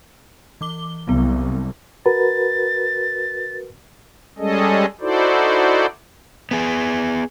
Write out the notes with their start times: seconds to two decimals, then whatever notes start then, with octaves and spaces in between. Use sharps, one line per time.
0.61 E3 D6 G7
1.07 C2 F#3 B3
2.06 F#4 A#4 B4 A6
4.38 G3 G#3 C#4 G#4 A4 D#5
5.01 D#4 E4 F#4 A4 C5 D5
6.51 B3 G#4